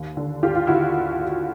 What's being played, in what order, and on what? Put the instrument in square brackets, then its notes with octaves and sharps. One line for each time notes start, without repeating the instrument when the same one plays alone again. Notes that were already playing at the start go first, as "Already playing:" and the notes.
Already playing: [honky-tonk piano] D#2
D3
D#2 F4 G4
F4
D3 E4 F#4